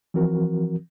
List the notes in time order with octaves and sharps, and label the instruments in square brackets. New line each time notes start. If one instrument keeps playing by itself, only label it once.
[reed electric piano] E3 F3 C4 F#4 A#4